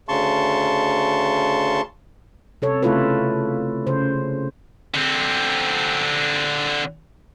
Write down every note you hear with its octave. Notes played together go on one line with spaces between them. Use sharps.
D2 C#3 A5 C6 C#6
C3 A4 C#5
C#3 A3 E4 F4 A4 B4
C#3 C5
D3 C4